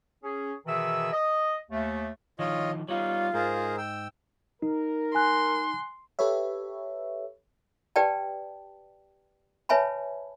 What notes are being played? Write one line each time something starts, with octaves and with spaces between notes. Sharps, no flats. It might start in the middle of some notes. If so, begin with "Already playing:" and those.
C#4 G#4
B2 D#3 E3 G#4 E5 E6
D#5
D#2 A3
D3 D#3 F3 F4 C#5 D#5
G3 B3 D#4 F4 C#5
G#2 G#4 A#4 C5
G5 E6
D#4 A#4
G#5 C6 F#6
G4 A4 B4 C#5 E5
G4 B4 D5 G5 A5
B4 C#5 E5 G#5 A5 B5